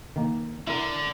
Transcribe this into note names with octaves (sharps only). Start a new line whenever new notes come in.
D#3 A#3
D3 E4 A#4